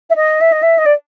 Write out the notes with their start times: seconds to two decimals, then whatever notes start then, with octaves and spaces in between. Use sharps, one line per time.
0.10 E5
0.16 D#5
0.41 E5
0.52 D#5
0.62 E5
0.78 D#5
0.86 D5